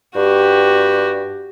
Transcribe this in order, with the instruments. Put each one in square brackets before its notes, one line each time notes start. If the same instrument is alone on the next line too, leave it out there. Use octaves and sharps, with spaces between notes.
[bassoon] G2 [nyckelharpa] F#4 G4